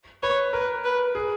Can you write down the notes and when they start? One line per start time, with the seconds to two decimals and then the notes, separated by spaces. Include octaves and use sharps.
0.23 B4 C#5
0.53 A#4 B4
0.85 B4
1.15 G#4